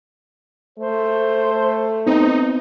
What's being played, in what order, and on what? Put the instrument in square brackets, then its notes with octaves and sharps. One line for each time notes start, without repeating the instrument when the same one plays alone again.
[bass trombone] A3 [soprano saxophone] C5
[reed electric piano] B3 C4 [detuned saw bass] D#4